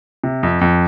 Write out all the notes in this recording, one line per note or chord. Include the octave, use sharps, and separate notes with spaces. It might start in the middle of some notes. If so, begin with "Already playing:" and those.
C3
F2
F2